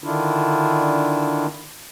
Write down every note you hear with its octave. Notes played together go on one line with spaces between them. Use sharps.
D3 D#3 D4 E4 F4